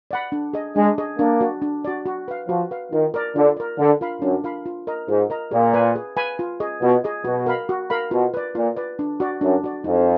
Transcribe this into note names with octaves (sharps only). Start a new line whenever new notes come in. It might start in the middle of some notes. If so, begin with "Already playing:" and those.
D5 F#5 B5
D4
G#4 D#5
G#3 D4
G#4 D#5
A#3 D4
F#4 D5
D4
F#4 D5
F#4
B4 F5
F3 F#4
B4 F5
D#3 F4
A#4 D5
D3 F4
A#4 D5
D3 D4
F4 A#4 F5 B5
F#2 D4
F4 A#4 F5 B5
F4
A#4 D#5 A#5
G#2 F4
A#4 D#5 A#5
A#2 G#4
B4 F5 G#5 B5
G#4
B4 F5 G#5 B5
F4
G#4 D#5
B2 F4
G#4 D#5
B2 F#4
A#4 F5 B5
F#4
A#4 F5 B5
B2 F4
B4 D5
A#2 F4
B4 D5
D4
F#4 D5
F#2 D4
F#4 D5
F2 D#4